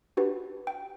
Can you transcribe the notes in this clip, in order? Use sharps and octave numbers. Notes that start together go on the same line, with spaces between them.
D4 F#4 G4 B4
G5